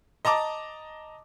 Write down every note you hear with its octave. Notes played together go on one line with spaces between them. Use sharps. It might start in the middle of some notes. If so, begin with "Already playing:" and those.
D#5 A5 A#5 D6